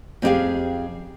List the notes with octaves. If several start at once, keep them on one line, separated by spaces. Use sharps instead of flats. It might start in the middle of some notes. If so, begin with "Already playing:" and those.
F2 C4 D#4 G4 G#4 F5